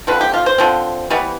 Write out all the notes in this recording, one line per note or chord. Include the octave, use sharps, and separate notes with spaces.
D3 F3 C4 B4
G4
F4
C5
D3 F3 C4
E3 G3 B3